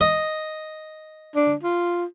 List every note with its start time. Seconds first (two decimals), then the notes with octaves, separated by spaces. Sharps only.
0.01 D#5
1.35 D4
1.63 F4